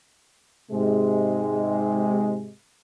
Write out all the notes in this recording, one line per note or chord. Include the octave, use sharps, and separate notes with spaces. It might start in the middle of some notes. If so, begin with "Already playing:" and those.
G#2 C3 G#3